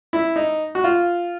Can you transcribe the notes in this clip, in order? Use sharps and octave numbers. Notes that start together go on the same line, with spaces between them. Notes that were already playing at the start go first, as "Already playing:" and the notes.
E4
D#4
F#4
F4